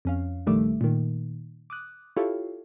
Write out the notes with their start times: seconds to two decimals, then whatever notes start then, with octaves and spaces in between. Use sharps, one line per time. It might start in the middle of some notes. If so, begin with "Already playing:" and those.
0.05 F2 C#4 F5
0.47 A#1 D#3 G3 A3 E5 D6
0.81 A#2 D#3
1.70 D6 D#6 F#6
2.16 E4 F4 G4 A4 C#5 F5